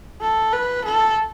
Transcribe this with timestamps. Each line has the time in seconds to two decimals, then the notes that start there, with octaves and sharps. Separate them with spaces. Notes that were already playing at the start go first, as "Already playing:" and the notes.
0.21 A4
0.53 B4
0.85 A4